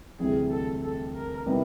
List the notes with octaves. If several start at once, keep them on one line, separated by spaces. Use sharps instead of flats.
D2 C3 E3 G3 C4 G#4
A4
A4
A#4
C3 D#3 G3 B3 E4